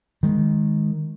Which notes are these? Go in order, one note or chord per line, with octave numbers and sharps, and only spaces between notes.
D#3 G#3